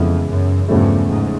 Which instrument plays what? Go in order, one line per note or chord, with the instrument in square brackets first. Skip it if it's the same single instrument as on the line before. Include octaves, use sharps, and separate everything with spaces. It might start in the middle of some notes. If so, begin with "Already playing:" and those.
Already playing: [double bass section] F2 [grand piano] C#3 E3 G#3 B3 E4
[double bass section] F#2
[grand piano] E2 C#3 F3 A3 [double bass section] G2
[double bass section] G#2